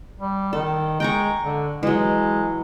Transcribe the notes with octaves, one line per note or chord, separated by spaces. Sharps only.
G3
D#3 A4
G#3 G5 A#5 C#6
D3
E3 F#3 G#3